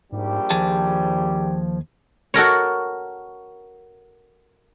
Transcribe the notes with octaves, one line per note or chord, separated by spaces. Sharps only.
A#1 G#2 G3 G4
D#2 F3 G#4 A5
F#4 A4 A#4 C#5